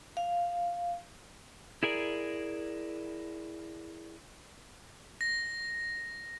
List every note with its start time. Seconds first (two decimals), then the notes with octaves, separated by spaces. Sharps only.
0.17 F5
1.83 E4 G#4 A#4 D5
5.21 A#6